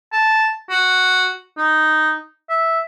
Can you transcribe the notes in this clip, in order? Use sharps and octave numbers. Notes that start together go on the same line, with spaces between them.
A5
F#4
D#4
E5